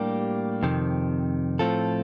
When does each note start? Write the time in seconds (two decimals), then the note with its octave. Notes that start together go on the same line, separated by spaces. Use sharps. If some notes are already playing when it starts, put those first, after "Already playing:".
Already playing: A2 G3 A#3 D4 G4
0.63 F2 C3 D#3
1.59 A2 F3 C4 F4 A4